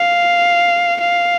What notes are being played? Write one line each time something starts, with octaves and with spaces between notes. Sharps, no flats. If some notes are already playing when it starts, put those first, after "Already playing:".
Already playing: F5
F5